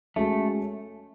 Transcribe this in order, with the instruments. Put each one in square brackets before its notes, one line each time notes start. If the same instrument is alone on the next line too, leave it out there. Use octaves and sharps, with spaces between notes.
[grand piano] G#3 C#4 F#4 A4 [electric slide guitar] A3